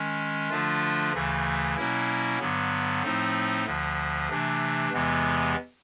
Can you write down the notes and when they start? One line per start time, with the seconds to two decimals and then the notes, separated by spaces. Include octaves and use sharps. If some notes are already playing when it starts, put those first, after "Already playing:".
Already playing: D#3 G#3 C#4
0.49 D3 F3 A3 D4 F4
1.13 D2 C#3 E3 A3
1.76 B2 F#3 A#3 C#4 E4
2.39 G2 D3 F#3 B3
3.02 A2 F3 A3 C4 D#4
3.66 D2 D3 F3
4.30 C3 E3 A3 D4
4.92 E2 C3 E3 G#3 B3